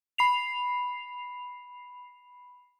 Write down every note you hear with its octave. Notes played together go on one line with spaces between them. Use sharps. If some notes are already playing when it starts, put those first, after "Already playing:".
B5 C7 F7